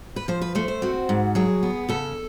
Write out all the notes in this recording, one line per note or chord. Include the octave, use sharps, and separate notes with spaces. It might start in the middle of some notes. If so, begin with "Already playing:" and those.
B4
F3 C5
B4
A3 C5
C5
C4 F#4
G#2
F#3 G#4
B3
C#3 A4